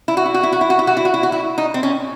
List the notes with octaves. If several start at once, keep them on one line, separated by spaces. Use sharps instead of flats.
E4
F#4
E4
F#4
E4
F#4
E4
F#4
E4
F#4
E4
F#4
E4
F#4
E4
D#4
C4
C#4